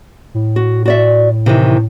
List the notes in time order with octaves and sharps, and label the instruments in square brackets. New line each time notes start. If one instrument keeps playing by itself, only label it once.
[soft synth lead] A2
[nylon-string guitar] F#4
F#4 D5 E5
C3 D#3 E3